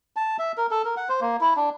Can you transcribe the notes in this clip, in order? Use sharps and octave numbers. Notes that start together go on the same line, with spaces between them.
A5
E5
A#4
A4
A#4
F#5
C5
A#3
E4
D4